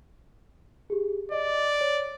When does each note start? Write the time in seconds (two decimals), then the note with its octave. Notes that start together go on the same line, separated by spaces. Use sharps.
0.90 G4 G#4
1.32 D5 D#5
1.81 C#5